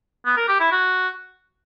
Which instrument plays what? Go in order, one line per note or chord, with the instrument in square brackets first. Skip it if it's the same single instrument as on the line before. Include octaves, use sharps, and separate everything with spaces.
[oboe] B3
A#4
G4
E4
F#4